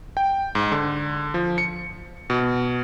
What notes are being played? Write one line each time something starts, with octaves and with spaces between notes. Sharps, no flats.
G5
G#2
D3
F3
C#7
B2